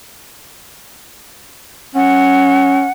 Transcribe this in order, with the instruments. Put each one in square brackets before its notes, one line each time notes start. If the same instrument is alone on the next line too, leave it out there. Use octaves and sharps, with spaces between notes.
[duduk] C#4 [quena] F#5